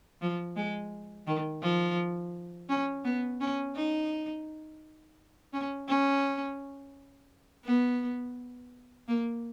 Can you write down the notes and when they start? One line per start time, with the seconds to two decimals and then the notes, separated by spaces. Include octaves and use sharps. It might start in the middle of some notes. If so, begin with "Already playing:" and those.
0.22 F3
0.56 G#3
1.27 D#3
1.62 F3
2.69 C#4
3.04 B3
3.40 C#4
3.75 D#4
5.53 C#4
5.88 C#4
7.65 B3
9.08 A#3